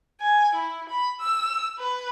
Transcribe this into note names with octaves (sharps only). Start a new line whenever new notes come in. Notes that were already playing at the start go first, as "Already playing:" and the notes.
G#5
E4
B5
E6
B4